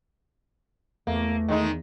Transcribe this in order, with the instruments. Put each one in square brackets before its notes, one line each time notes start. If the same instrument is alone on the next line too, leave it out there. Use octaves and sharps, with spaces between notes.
[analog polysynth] E2 [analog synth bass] A3 [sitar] A#3
[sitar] D#3 G#3 D#4